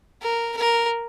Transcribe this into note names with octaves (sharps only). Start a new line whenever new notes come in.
A#4
A#4